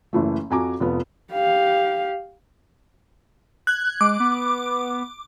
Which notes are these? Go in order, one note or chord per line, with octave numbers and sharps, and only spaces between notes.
F#1 E3 A3
F2 F#4 G#5 A#5 D6
F1 F3 B3
G4 F5
F#6 G#6
G#3 D6
B3